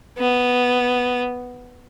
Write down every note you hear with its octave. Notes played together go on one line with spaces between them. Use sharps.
B3